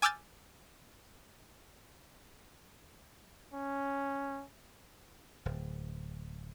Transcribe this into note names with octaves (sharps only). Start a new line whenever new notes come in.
G#5 D6 E6 F6 G6 A6
C#4
D1